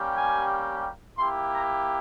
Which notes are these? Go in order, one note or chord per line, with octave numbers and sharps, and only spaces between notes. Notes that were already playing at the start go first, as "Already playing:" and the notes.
Already playing: G3 A#3 C#4 G4
G#5
A#3 E4 G4 C6
A#5